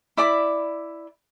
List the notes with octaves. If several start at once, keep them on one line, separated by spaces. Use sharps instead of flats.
E4 D5 B5 D6